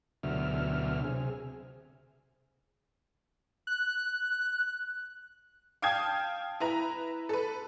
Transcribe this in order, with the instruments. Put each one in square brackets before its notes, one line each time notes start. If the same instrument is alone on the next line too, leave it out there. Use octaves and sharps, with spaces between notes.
[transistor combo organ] D2 B2 D3 F#3 E5 F6
C3 G#4
[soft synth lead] F#6
[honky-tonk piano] F5 G5 A5 D#6 G#6
E4 B4 A#5
A4 B4